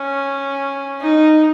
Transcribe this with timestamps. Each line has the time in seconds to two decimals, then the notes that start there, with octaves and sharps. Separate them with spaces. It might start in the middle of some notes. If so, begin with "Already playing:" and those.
Already playing: C#4
1.01 D#4